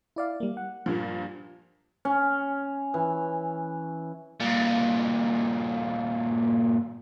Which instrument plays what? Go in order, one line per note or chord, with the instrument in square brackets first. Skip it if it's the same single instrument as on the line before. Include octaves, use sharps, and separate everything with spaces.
[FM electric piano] E4 D5 F5
G3 A#3
F#5
[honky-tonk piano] G2 A#2 F3
[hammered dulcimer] C#4
E3
[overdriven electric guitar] G2 A#2